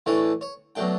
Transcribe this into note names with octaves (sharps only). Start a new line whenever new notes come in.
A2 E3 A3 D4 C#5
C#5
B2 F#3 A3 D4 G5